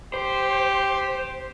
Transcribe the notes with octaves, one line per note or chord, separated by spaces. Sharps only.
G4 C5